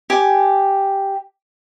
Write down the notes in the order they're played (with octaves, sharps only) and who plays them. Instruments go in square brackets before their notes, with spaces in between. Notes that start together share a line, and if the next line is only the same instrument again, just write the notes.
[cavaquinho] G4 G#5